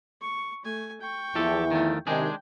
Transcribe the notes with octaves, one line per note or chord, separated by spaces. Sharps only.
C#6
A3 G#5
G5 C#6
E2 F3 E4 G4 A4
D#3 F3 A3
C3 D#3 G#3 D4 G#4 G5